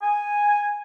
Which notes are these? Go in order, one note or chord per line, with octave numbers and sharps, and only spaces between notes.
G#5